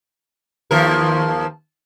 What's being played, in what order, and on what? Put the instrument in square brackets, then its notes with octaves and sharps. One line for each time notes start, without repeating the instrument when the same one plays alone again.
[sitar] D#2 F3 A#4